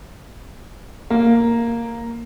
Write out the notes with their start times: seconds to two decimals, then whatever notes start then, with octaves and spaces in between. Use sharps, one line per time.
1.10 A#3